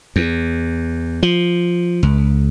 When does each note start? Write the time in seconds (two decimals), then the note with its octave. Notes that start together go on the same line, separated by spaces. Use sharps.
0.16 E2
1.23 F3
2.03 C#2